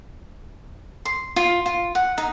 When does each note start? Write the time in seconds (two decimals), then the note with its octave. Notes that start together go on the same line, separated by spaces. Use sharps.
1.05 C6
1.36 F4
1.66 F4
1.95 F#5
2.18 D#4